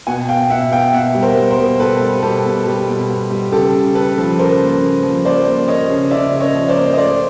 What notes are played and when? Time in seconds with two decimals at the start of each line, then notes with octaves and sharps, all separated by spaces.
0.07 B2 F#5 G#5
0.29 B3 F5 G5
0.50 B2 E5 F#5
0.72 B3 F5 G5
0.93 B2 E5 F#5
1.15 G3
1.22 A#4 C5
1.37 G3
1.51 A#4 C5
1.59 B2
1.80 B2 A4 B4
2.02 G3
2.22 B2 G4 A4
2.45 B2
2.66 G3 G4
2.88 B2
3.09 B3
3.31 G3
3.52 C#3 G4 A4
3.74 C#3
3.95 C#3 A4 B4
4.18 F3
4.39 C#3 A#4 C5
4.61 A#3
4.81 C#3
5.03 F3
5.25 A#3 C5 D5
5.47 A#3
5.68 A#3 C#5 D#5
5.90 C#3
6.11 C#3 D5 E5
6.33 C#3
6.40 C#5 D#5
6.55 F3
6.68 C5 D5
6.76 A#3
6.93 D#5
6.97 A3 C5 D5